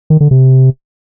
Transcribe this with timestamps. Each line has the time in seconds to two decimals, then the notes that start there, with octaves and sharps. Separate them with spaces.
0.10 D#3
0.20 D3
0.31 C3